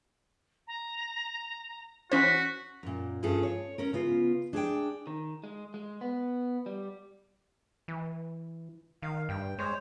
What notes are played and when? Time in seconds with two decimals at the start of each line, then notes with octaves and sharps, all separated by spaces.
0.67 A#5
2.12 E3 C#4 F#4 C5 B6
2.83 F#2 A#2
3.23 G2 C#4 F4 G#4 A4
3.43 C#5
3.78 C#4 A#4
3.93 C#3 B3 F4
4.53 D4 G#4 C#5 G5
5.07 D#3
5.44 G#3
5.74 G#3
6.01 B3
6.66 G3
7.88 E3
9.02 D#3 F5
9.29 G2 G5
9.59 G#3 C5 C#5